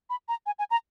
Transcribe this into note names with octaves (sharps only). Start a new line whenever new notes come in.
B5
A#5
G#5
G#5
A#5